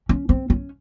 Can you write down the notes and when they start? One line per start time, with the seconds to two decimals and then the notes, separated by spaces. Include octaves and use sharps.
0.09 C#4
0.29 C4
0.50 C#4